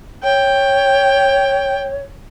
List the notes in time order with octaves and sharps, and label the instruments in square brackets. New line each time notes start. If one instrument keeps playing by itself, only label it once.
[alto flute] C#5 [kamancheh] G5